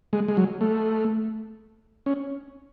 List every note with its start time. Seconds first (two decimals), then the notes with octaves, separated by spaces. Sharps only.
0.13 G#3
0.28 G#3
0.37 F#3
0.61 A3
2.06 C#4